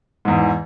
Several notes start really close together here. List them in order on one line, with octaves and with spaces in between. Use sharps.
G#2 E2 E3